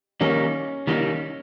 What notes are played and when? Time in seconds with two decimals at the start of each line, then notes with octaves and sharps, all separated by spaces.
0.21 D#3 G3 A#3 C#4 D#4
0.87 D#3 G3 A#3 D#4